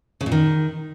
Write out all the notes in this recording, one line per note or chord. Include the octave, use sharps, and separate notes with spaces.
C#3
A#2
D#3